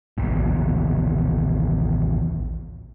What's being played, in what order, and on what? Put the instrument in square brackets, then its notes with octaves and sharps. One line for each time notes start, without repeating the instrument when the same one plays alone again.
[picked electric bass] A1 D#2 B2